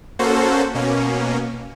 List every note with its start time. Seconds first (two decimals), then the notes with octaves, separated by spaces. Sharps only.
0.19 A#3 C#4 F#4 A4 C5
0.74 B2 A#3 C#4